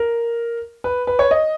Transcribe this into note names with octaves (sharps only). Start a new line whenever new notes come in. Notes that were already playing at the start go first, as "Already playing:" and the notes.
Already playing: A#4
B4
B4
C#5
D#5